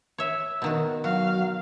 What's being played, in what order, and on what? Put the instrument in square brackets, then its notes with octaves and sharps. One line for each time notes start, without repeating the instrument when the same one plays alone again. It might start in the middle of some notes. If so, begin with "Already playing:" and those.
[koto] C#5 E5
B2 D#3 F#4
[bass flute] F#3 [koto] F#4 [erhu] F5